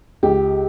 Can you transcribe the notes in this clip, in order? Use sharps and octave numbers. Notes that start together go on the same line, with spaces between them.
C#2 G4